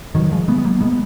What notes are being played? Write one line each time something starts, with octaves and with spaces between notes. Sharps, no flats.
D#3 F#3
F3 G#3
G#3 B3
B3
F#3 A#3
G#3 B3